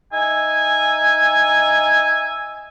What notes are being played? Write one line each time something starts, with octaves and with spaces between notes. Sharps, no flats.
D#4 E5 G#5